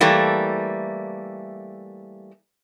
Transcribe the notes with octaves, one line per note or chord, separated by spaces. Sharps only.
E3 G3 A3 A#3